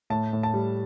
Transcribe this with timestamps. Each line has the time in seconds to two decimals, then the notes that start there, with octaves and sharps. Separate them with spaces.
0.10 A2 A5
0.33 A2
0.43 A5
0.54 G3